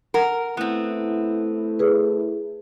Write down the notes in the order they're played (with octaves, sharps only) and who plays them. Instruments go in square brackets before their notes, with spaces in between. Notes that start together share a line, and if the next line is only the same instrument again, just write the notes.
[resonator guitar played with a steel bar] A#4 [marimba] F#5
[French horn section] A3 E4 [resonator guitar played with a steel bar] B3 C4
[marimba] G#4 B4